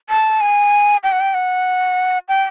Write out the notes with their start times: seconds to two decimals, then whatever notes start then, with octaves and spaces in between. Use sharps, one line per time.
0.10 A5
0.41 G#5
1.04 G5
1.12 F#5
1.20 G5
1.34 F#5
2.28 G5